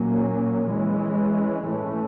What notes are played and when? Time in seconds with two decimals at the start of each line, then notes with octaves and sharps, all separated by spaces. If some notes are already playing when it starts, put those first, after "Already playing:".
Already playing: A#2 F#3 A#3 C#4
0.67 E3 G#3 C#4
1.64 A2 E3 A3 C#4